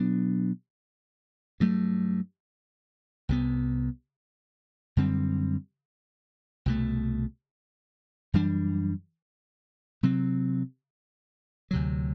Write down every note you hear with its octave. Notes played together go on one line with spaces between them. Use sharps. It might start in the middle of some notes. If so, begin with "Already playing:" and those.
Already playing: B2 F#3 B3 D4
G2 F#3 A3
C2 C3 E3 B3
F#2 D3 G3 C4
C2 B2 A3
F#2 E3 G3 D4
C3 F#3 C4
D2 C3 F#3